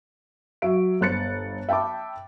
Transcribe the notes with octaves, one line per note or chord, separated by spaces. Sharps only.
F#3 E5 D7
G1 C5 F#6 A6 C#7
E5 G5 A5 B5 D6